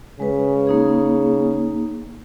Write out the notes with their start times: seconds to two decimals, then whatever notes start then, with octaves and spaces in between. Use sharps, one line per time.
0.20 C#3 G#3 B4
0.67 A#3 D#4 G#4